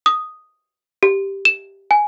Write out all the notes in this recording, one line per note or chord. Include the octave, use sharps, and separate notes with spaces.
D#6
G4
E7
G#5